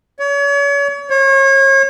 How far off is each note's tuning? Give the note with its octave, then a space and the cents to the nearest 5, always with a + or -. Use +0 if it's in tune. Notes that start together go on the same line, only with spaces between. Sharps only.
C#5 +35
C#5 -35